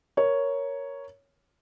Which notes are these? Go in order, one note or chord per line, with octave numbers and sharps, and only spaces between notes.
A#4 C#5